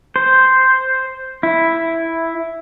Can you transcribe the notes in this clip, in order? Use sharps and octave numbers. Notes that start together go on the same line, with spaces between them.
C5
E4